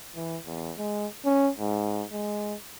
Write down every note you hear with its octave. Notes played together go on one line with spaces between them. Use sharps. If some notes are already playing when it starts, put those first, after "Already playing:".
E3
E2
G#3
C#4
G#2
G#3